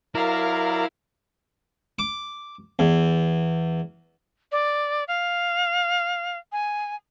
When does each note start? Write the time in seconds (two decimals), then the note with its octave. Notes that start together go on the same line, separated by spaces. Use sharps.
0.15 F#3 E4 A#4 D5 F5 A#5
1.99 D6
2.79 E2
4.52 D5
5.08 F5
6.52 G#5